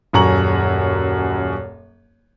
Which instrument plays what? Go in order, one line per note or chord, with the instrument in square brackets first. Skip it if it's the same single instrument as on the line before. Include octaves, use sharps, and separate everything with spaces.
[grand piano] D#1 F#2 G#5 A#5 C#6 F#7